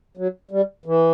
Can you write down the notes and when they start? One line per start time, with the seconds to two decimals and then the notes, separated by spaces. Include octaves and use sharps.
0.17 F#3
0.51 G3
0.86 E3